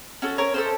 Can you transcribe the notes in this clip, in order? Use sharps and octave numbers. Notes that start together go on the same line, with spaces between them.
C#4 F#4 A4
A#4 C#5
C#4 F4 A4 C5 D#5